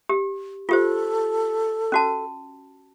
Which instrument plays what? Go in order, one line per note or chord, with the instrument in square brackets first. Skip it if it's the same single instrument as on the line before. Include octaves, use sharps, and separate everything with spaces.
[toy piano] G4
[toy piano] F4 G4 C5 [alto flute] A4
[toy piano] C#4 F#4 A5